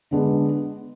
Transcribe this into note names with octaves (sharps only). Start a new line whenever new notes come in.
D3 G#3 B3 D4